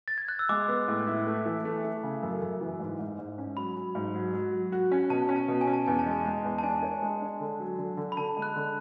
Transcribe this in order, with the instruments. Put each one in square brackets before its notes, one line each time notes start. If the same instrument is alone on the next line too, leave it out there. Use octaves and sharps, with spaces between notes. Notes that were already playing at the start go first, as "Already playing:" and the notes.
[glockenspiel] A6
G#6
F#6
E6
[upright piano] G#3 [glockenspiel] D6
[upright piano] B3
A2
E4
A3
E3
A3
A3
C#3
F#2
F#2
E3
G#2
G#2
G#2
C#4
[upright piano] F#3 [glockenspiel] B5
[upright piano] F#3
G#2
F#3
F#3
F#4
F#4
C#4
[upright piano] B2 [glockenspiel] A5
[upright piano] C#4
[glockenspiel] A5
[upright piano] B2
[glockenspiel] G#5
[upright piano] C#4
[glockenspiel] A5
[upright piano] E2 [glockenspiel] G#5
[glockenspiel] A5
[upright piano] G#3
[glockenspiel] G#5
[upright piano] G#3
E2
[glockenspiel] A5
[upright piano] D4 [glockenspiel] G#5
[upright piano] C#5
G#3
D4
D3
F#3
D3
D3
[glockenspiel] B5
[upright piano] D3 [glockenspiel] A5
[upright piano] G#3
[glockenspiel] F#6
[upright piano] D3